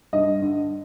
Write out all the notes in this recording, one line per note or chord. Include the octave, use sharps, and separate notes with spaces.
G2 D#5
D3